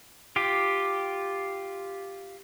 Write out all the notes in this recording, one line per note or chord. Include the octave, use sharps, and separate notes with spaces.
F4 G4